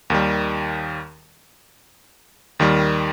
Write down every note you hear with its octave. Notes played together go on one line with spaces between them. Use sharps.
D#2 D#3 G3
D#2 D#3 G3